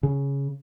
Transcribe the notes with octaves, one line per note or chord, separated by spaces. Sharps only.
C#3